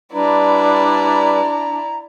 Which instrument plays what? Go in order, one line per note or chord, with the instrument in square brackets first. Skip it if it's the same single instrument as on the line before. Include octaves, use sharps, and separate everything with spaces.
[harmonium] G3 B4 [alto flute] D4 [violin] E4 D5 [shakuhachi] A#5